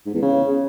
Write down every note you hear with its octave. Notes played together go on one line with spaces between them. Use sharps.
G#2
E2
C#3